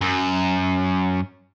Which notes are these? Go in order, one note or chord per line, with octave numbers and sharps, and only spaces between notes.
F#2